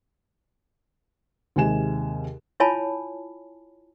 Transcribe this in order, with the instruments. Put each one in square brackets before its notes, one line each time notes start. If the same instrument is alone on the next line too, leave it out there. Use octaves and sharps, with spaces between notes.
[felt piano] D#2 C3 G#3 G#5 E7
[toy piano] E4 F4 C#5 G#5 A5 B5